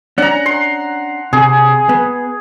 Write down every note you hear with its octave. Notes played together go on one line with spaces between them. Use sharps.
C#4 D4 F#5 A#5
C6
C3 G#4
B3